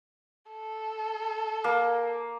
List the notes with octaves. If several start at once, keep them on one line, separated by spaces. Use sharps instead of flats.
A4
A#3